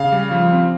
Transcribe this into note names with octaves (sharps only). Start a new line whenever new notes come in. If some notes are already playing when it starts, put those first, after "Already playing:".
Already playing: C#3 F5
G3
F3
C4